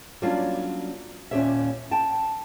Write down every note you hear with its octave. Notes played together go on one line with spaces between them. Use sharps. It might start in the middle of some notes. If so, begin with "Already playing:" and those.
F#3 G3 A#3 C#4 D4 F4
D#2 A#2 C#4 G4 C#5 E5
G5 A5